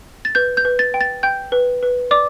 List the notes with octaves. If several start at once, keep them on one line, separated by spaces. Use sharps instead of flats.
A6
B4 G6
G6
B4
A6
G5
A6
G5 G6
B4
B4
D5 D6